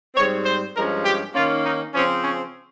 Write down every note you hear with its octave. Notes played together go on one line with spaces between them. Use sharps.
G#2 G3 C4 C#5
C5
G2 F3 G#3 C#4 A#4
G4
D#3 A#3 C#4 F4
D#4
C#3 F3 C4 C#4
C#4